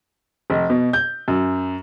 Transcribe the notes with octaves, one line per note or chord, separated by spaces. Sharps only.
F1
B2
G6
F#2